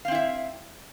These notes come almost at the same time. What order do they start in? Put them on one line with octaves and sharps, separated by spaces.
F5 C4 E4 E5